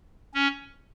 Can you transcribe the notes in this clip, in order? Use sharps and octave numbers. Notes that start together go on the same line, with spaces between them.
C#4